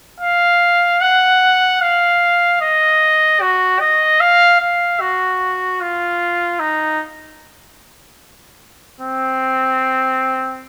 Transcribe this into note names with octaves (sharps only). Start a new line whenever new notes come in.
F5
F#5
F5
D#5
F#4
D#5
F5
F5
F#4
F4
D#4
C4